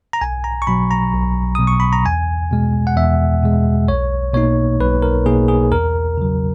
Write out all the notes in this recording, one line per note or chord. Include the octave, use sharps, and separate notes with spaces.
A#5
B1 G#5
A#5
C#6
B2 F#3 B5
A#5
B1
B2 F#3 D#6
C#6
B5
A#5
E2 G#5
B2 G#3
F#5
E2 E5
B2 G#3
B1 C#5
B2 A#3 D#4 C#5
B1 B4
A#4
B2 A#3 D#4 G#4
G#4
E2 A#4
C#3 F#3